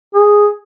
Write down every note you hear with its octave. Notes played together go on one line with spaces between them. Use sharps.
G#4